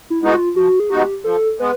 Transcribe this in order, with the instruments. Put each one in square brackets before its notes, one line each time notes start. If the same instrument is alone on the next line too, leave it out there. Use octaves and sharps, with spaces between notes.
[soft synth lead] E4
[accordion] G#3 B3 D#4 F#4 [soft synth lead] E4
[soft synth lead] F4
[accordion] F3 [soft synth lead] F#4
[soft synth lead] G#4
[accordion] G#3 B3 D#4 F#4 [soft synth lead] G4
[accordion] F3 [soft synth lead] A4
[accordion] G#3 B3 [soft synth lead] B4